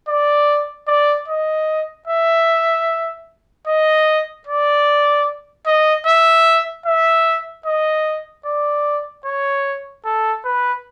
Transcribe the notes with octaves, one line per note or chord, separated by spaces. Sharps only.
D5
D5
D#5
E5
D#5
D5
D#5
E5
E5
D#5
D5
C#5
A4
B4